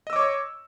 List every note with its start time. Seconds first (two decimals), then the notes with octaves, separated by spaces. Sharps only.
0.07 D#5
0.10 E6
0.13 D6
0.16 C#5
0.19 C#6